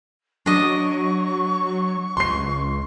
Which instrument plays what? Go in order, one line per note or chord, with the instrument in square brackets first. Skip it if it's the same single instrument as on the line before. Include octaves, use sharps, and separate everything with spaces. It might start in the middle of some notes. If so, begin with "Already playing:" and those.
[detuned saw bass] F#3 [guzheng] D4 D#5 [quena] C#6
[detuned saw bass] C#2 [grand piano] C6 C7